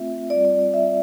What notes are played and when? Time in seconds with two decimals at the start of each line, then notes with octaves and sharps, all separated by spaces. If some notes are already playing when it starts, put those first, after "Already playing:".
Already playing: A3 C4 F4 E5
0.30 G3 C4 F4 D5
0.45 D5
0.59 D5
0.74 E5